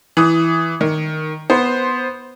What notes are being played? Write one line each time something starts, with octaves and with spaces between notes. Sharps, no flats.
E3 D#6
D#3
B3 C5